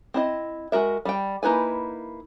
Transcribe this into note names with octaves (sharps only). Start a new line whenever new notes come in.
C4 E4 D#5
G#3 F#4 A#4 E5
G3 G5
A#3 D#4 E4 B4 G#5